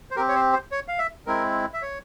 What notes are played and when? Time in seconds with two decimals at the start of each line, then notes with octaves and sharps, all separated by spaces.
0.11 C5
0.16 C4 G4 A#4
0.29 C#5
0.35 C5
0.53 C5
0.71 C#5
0.88 F5
0.99 E5
1.26 G#3 C4 E4 A#4
1.74 E5
1.82 C#5